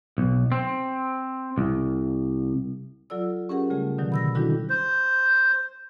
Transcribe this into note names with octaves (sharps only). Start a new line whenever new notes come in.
B1
C4
C2
F#3 F4 A4 D5 E6
C#4 G4 G#4 A#4 F#5
C#3 G3 A3 G#4
B2 D3 D#3 F#3
B5 E6 A#6
D#3 G3 D4 E4 F#4 A4
C5